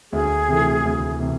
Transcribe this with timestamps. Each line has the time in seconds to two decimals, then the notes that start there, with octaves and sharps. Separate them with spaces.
0.12 D2 G#4
0.48 C3 E3 A3
0.85 D2
1.20 C3 E3